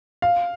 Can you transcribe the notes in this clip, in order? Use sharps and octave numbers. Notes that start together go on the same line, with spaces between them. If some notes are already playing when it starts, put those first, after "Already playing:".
F5